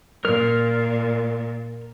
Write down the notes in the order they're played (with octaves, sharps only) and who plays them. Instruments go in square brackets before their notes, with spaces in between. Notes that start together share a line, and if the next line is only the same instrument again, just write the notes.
[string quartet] A#2 [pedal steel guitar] A#4 F6